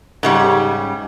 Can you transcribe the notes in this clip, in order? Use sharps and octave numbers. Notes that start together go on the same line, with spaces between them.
G#2 C#3 G3